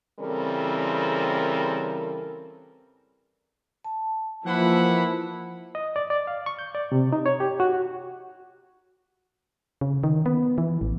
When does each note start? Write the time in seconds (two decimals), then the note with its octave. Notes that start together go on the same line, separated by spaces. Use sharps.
0.20 C#3 E3 G3 C4 A4 A#4
3.84 A5
4.45 E3 F3 A#3 E4 F#5 B5
5.75 D#5
5.96 D5
6.10 D5
6.27 F5
6.46 C#6
6.59 G6
6.75 D5
6.92 C3
7.13 D#4
7.26 C#5
7.40 G4
7.60 F#4
9.81 C#3
10.04 D#3
10.26 B3
10.58 E3
10.81 A1